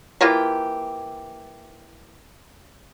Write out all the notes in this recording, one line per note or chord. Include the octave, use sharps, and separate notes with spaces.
E3 A#3 F4 G4